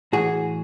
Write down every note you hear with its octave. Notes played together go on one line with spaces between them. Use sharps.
A2 E3 F#4 G#4